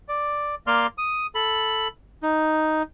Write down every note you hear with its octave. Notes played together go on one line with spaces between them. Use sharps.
D5
A#3 D5 C6 F6
D#6
A4 B5
D#4